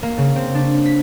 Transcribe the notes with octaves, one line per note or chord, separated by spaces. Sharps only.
A#3
C#3
C4
D4
B6